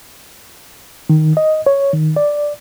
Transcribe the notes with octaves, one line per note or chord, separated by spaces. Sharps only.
D#3
D#5
C#5
D#3
D5